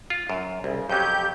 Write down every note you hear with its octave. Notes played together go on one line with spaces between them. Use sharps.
F4
F#2
C2 C#3
F2 F#3 G4 G6